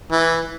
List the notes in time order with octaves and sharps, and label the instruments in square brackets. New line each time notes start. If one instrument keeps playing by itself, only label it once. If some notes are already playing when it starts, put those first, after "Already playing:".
[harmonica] E3